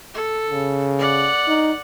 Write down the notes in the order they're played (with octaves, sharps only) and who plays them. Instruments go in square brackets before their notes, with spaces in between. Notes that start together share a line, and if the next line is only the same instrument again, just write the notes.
[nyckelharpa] A4
[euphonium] C#3
[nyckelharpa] D5 F#5
[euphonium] D#4